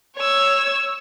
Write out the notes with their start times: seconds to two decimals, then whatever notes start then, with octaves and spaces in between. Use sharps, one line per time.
0.17 C#5 E6